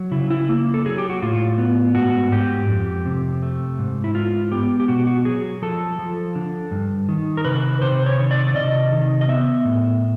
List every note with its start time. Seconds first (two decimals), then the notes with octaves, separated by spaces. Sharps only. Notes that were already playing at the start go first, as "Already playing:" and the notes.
Already playing: F#3
0.11 C#3 E4
0.31 E4
0.49 A#3
0.74 A4
0.85 F#3 G#4
0.98 G4
1.10 F#4
1.22 A2 F4
1.58 B3
1.95 G#2 F#4
2.32 G#2 G4
2.69 F2
3.06 C3
3.42 A3
3.79 G#2
4.04 E4
4.15 G#3 F4
4.52 B3 G4
4.80 G4
4.88 B2 F#4
5.07 F#4
5.25 F#3 G#4
5.62 F3 A4
5.99 F3
6.35 D3
6.71 G2
7.09 D#3
7.37 A#4
7.45 C3 B4
7.82 C3 C5
8.06 C#5
8.19 D#3
8.31 D5
8.55 C3 D#5
8.92 D#3
9.21 D#5
9.28 B3 E5
9.65 A2